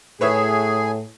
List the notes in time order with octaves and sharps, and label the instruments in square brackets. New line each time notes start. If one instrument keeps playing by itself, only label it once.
[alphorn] A2 [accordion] G#4 [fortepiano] B4 C#5 E5